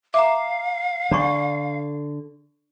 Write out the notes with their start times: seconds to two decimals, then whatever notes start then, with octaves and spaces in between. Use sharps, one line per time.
0.14 E5 F5 A#5 D6
1.11 D3 D4 D5 C#6